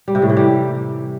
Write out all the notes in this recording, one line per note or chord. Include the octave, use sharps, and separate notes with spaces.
G3
C3
A2
E3
G3